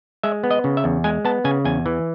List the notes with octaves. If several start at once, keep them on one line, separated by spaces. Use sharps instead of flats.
G#3 E5
B3
D#5
C#3
E5
E2
G#3 G#5
B3 A5
C#3 G#5
E2 G#5
E3